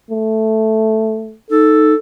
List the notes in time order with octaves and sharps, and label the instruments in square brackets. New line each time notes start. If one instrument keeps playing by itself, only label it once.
[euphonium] A3
[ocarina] D#4 [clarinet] A4